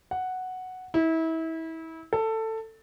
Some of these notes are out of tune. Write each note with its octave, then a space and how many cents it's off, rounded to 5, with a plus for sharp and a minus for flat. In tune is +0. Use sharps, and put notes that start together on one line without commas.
F#5 +0
E4 -30
A4 +15